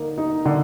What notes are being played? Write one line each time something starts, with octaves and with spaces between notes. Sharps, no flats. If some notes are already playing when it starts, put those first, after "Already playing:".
Already playing: D3 A#3 D#4
D#4
D3